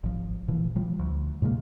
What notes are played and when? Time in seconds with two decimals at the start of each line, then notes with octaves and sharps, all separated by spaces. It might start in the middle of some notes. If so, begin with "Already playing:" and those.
0.04 G#1 F3
0.48 A#2 E3 F3
0.76 F3 G3
0.99 D2
1.42 A2 C3 G#3 A#3